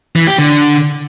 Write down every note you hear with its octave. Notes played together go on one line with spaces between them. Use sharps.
E3
G4
D3